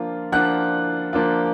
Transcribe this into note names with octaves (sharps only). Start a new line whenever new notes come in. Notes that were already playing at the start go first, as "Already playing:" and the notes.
Already playing: F3 A#3 D4 F4
F3 A#3 D4 F4 F#5 F#6
F3 A#3 D4 F4